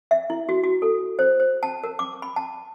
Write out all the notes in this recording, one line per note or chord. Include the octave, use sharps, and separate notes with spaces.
E5
E4
F#4
F#4
A4
C5
C5
A5
A#4
D6
B5
A5